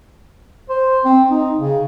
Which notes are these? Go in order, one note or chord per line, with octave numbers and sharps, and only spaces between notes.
C5
C4
D#4
C#3